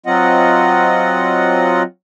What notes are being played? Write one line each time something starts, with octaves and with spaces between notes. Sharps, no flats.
F#3 C4 F4 D#5 F#5